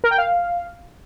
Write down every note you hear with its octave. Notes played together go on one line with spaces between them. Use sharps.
A#4
G5
F5